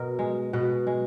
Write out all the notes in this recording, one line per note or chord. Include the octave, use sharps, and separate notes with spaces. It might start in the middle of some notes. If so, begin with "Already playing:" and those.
Already playing: B2 A#4
G#3
B2 B4
G#3